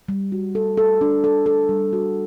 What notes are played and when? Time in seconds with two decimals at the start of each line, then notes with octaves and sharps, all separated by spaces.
0.09 G3
0.32 F#4
0.55 A4
0.77 A4
1.01 D4
1.24 A4
1.46 A4
1.69 G3
1.93 F#4